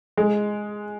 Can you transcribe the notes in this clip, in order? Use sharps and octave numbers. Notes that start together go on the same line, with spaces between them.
G#3